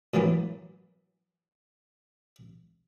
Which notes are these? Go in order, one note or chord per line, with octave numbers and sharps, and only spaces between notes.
A2 E3 F#3 A#3 B3